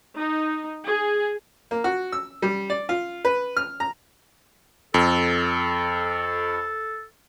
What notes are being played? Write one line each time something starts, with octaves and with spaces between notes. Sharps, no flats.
D#4
G#4
A#3
F#4
E6
G3
D5
F4
B4
F6
A#5
F2 A4